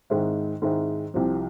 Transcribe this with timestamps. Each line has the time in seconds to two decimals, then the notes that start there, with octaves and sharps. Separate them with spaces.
0.10 G#2 D#3 G#3 C4 E4
0.62 G#2 D#3 G#3 C4 E4
1.14 C2 C3 F3